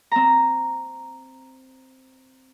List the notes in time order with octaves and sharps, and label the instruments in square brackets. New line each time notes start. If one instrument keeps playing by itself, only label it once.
[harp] C4 A#5